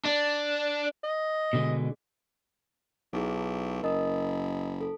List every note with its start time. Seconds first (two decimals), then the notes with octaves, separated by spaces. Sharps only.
0.05 D4
1.04 D#5
1.53 B2 D3 G#3
3.13 B1 D#4 E4 G#4
3.83 F#1 A#4 D#5 D#6
4.81 A4